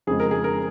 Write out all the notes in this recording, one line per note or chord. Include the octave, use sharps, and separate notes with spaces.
F2 C#3 G#3 G#4
A#4
G#4
A#4